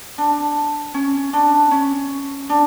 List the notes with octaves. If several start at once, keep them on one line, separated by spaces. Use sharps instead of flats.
D4
C#4
D4
C#4
D4